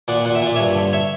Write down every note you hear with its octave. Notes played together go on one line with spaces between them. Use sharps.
A#2 D5 F#5
A#2 F#5
E5
A#2 D5
G2 C#5 E5
D3
C#5 E5